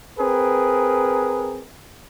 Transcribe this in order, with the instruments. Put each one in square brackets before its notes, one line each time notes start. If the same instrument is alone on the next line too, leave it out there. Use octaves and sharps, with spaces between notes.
[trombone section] C4 G#4 A#4 B4